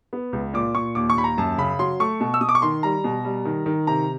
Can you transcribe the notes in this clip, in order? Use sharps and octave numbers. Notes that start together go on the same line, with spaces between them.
B3
C#2
A#2 D6
A#2 C#6
D#2 D6
C#6
D#2 B5
A#5
F#2 A5
C#3 B5
F#3 C6
A3 C#6
B2
E6
B2 D#6
D6
C#6
D#3 C6
G3 A#5
B2
G3
D#3
D#3
C3 A#5